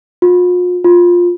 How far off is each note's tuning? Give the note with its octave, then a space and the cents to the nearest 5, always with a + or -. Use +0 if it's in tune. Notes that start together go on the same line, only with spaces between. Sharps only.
F4 +45
F4 +10